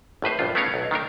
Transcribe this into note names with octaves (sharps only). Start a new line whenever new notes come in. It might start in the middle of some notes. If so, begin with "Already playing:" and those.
G#1 A2 B4 C5
A#1 G2 F4
A3 B3 C#4 A#4 C#5 F5
B1
D#3 A3 D4 A#4